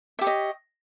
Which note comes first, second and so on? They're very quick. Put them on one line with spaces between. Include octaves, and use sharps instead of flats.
E5 G4 C#5 D#5